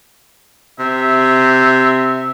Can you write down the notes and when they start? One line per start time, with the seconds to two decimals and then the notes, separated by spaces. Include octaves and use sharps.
0.79 C3 E5